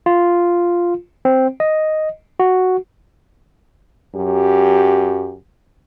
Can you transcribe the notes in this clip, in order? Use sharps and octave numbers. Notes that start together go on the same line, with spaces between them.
F4
C4
D#5
F#4
F#2 F#3 G4